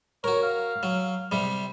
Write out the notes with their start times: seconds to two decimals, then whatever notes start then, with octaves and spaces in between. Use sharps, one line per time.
0.24 F#4 A#4 C#5
0.42 F5
0.83 F#3
1.32 C3 G3